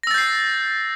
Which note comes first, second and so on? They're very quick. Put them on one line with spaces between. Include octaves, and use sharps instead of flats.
A#6 E6 A6 G6 C7